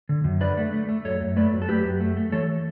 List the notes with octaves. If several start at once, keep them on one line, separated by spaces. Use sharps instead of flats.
D3
F#2
D3 B4 D5
A3
A3
A3
F#2 A4 C#5
F#2
A3 B4 D5
F#2
A4
F#2 G4 B4
F#2
A3
A3
E3 A4 C#5